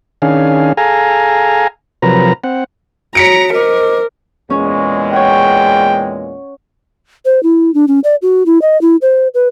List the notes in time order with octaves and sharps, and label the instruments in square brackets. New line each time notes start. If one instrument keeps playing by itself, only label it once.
[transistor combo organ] D#3 C#4 D4 G#4 F5
G#4 A4 F5 G#5 A#5
C3 F3 F#3 A#4 B4 A#5
C4 F#5
[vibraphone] F#4 C#5 [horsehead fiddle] A#5 [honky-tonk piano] B6 C#7 D7
[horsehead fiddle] A#4 [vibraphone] C5 D#5 D6
[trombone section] E2 A#2 G#3 [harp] C#4
[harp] C#5 F#5 [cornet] G5
[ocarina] C5
E4
D4
C#4
D5
F#4
E4
D#5
E4
C5
B4